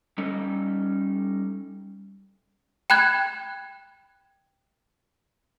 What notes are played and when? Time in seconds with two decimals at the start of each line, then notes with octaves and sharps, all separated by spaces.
0.18 G3 C#4 D#4 A4
2.90 G5 B5 F#6 G#6